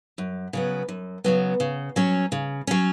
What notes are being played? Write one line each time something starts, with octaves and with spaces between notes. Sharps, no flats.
F#2
C#3 F#3 B3
F#2
C#3 F#3 B3
C#3
F#3 C#4
C#3
F#3 C#4